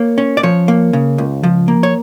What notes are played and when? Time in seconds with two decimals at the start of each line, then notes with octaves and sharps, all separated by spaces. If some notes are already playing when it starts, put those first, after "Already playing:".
Already playing: A#3 C#5
0.18 C#4
0.37 D5
0.43 F3 C#5
0.68 A#3
0.93 C#3
1.18 C#2
1.43 F3
1.68 A#3
1.83 C#5